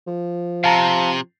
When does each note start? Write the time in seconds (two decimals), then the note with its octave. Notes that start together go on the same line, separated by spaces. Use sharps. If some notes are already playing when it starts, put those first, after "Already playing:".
0.07 F3
0.64 C3 F5 A5 A#5